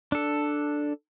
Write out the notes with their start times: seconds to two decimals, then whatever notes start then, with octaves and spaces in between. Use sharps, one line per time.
0.12 D4 A4